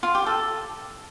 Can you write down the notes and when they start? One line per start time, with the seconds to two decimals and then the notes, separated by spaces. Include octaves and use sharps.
0.03 F4
0.15 G4
0.26 A4